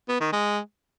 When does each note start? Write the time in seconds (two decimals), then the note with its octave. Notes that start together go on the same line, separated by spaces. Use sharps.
0.09 B3
0.21 D#3
0.33 G#3